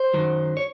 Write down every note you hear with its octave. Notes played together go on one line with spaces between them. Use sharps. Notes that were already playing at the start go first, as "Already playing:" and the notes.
Already playing: C5
F#2 D#3 F#3
C#5